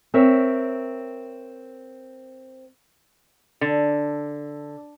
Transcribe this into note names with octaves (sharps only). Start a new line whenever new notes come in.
C4 A#4 C#5 E5
D3